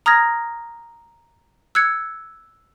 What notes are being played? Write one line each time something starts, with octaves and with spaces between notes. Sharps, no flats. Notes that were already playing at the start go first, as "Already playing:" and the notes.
A#5 D#6 F6 G#6 A#6
E6 F#6 G#6 C#7